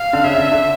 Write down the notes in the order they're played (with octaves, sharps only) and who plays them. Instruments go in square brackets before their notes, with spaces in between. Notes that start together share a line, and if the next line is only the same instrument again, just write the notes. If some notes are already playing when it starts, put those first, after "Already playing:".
Already playing: [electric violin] F5
[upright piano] D3
[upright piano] C#3 [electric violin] E5
[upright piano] D3
D3